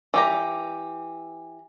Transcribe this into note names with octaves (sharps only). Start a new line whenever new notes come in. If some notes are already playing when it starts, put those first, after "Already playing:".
E3 G4 A#5